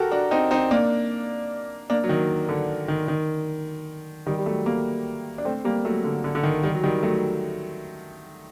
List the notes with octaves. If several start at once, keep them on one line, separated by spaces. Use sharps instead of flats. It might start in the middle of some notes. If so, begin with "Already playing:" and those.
Already playing: F#4 G4 A4 A#4
D4 F#4
C4 D#4
C4 D#4
A#3 D4
A#3 D4
F#3
D#3
D3
D#3
D#3
D#3 G3
G3
F#3 A3
G3 A#3
D4
A3 C4
G3 A#3
F#3 A3
D3
D3
D3
D#3
D#3 G3
F#3
D#3 G3
F#3 A3